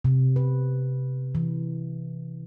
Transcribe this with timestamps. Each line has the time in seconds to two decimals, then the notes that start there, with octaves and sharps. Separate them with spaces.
0.05 C3
0.36 B4
1.35 E3